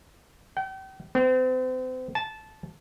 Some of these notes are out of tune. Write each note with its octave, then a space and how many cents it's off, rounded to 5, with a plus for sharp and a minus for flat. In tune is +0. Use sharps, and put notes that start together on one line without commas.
G5 -40
C4 -35
A5 -15